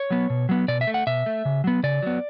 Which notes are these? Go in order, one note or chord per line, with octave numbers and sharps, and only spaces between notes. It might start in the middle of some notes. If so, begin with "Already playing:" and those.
Already playing: C#5
F#3 B3
B2
F#3 B3
B2 D5
E5
A3
F#5
B2 E5
A3
C#3
F#3 B3
C#3 D5
F#3 B3